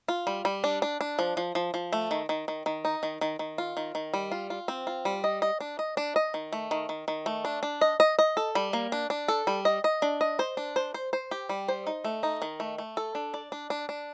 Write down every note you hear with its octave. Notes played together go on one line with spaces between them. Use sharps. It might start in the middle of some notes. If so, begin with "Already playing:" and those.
F4
G3
G3
D4
D4
D4
F3
F3
F3
F3
A3
D#3
D#3
D#3
D#3
D#4
D#3
D#3
D#3
F4
D#3
D#3
G3
F4
F4
C4
F4
G3
D#5
D#5
D4
D#5
D4
D#5
D#3
A3
D#3
D#3
D#3
A3
D4
D4
D#5
D#5
D#5
A4
G3
A#3
D4
D4
A4
G3
D#5
D#5
D4
D#5
C5
D4
C5
C5
C5
G4
G3
C5
D#4
A3
D#4
D#3
A3
A3
A4
D4
D5
D4
D4
D4